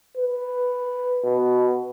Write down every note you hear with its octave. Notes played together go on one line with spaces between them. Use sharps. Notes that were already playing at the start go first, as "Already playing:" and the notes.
B4
B2